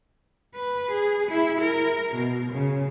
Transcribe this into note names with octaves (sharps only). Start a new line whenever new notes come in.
B4
G#4
E4
A#4
B2
C#3